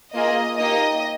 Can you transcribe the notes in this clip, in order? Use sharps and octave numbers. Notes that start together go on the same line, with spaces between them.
A#3 F4 G#4 D#5
A#3 D#4 G4 D#5